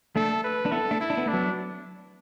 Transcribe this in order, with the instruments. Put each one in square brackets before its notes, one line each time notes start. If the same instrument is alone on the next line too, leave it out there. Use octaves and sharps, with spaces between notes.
[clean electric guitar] A3 D4 [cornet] A4
[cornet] B4
[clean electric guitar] D4
[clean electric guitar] B3 E4 [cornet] A4
[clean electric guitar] A3 D4
[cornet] E4
[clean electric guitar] D4
B3
[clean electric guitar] A3 [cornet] D4
[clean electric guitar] F#3 B3